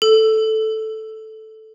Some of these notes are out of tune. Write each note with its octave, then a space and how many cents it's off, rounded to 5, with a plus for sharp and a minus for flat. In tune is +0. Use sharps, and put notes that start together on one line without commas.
A4 -5